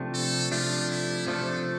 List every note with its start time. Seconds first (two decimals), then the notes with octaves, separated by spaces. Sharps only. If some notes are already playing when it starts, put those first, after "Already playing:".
Already playing: C3 F3 A3 D4
0.14 A4
0.52 C3 F3 A3 D4 F4
0.90 E4
1.27 C3 F3 A3 D4 A4